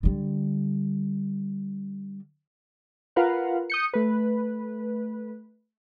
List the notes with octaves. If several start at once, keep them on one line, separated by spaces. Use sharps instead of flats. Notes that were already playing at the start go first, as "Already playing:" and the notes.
D3 G3
F4 A#4 B4 F5 F#5
D#6 G6 C#7
A3 B4